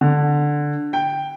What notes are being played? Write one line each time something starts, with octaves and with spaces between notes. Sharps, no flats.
D3
G5